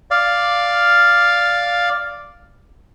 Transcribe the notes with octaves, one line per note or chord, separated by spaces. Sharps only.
D5 F5